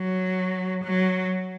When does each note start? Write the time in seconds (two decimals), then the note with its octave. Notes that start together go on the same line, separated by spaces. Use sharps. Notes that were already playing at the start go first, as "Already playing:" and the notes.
Already playing: F#3
0.84 F#3